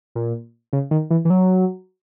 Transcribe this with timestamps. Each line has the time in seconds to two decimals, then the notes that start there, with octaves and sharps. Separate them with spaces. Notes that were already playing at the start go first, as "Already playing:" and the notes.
0.15 A#2
0.73 C#3
0.91 D#3
1.10 E3
1.25 E3
1.30 F#3